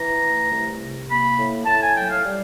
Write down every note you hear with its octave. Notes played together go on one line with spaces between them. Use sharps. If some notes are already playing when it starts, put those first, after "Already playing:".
Already playing: E3 A#5
A3
C2
C3
A#3 B5
A2
A2 A5
G#5
F#3 G5
F5
G3